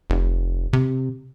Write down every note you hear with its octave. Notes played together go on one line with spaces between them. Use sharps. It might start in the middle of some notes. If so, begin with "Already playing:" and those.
F1
C3